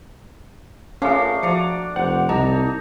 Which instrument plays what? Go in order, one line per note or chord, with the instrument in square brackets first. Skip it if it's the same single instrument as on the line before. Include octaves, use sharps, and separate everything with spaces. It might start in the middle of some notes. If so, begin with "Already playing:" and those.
[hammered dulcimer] A3 A#3 D4 [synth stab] C#4 F4 [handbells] G#4 F5
[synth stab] F3 [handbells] F#4 C#7 [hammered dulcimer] D5 A#5
[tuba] F1 [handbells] C5 [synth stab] F#5
[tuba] C2 [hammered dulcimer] D#4 [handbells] D#5 A5 A#5